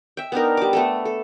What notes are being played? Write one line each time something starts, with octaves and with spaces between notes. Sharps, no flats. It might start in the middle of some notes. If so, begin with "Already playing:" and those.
E5 G5
B3 D4 D#4 A#4
G3 D6
A3 B3 A4
A4